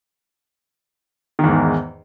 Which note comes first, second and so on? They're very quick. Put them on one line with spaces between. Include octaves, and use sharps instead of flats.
D#3 E2 G#2